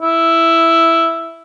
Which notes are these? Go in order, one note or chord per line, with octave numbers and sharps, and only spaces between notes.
E4